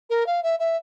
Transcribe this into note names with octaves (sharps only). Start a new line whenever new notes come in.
A#4
F5
E5
E5